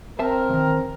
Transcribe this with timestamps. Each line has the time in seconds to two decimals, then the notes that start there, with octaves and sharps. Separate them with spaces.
0.19 C4 A#4 C5 E5 A5
0.49 D#2 D#3